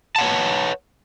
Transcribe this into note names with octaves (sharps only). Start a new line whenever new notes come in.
B4 C#5 F#5 A5